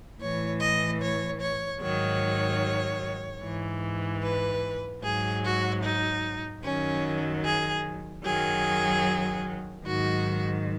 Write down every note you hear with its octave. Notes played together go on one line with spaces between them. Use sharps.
A2 E3 C#5
D#5
C#5
C#5
G#2 D#3 F#3 C#5
G#2 E3
B4
G#2 F#3 G#4
F#4
D#4
F#2 D#3 F#3 C#4
G#4
F#2 D#3 F#3 G#4
G#2 D#3 F#3 F#4